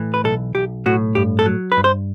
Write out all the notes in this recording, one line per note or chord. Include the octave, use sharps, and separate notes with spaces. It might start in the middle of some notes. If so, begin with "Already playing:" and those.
Already playing: A2 E3
B4
B1 A4
B1 G4
A2 F#4
G2 G4
A4
F#3
B4
G2
C5